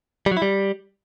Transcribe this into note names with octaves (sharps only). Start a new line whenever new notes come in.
G3
F#3
E4
G3